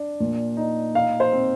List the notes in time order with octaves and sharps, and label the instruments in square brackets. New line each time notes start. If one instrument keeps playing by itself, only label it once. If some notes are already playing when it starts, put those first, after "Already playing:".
Already playing: [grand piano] D4
A#2
D#4
[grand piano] D#4 [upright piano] F5
[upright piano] C5
[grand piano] C4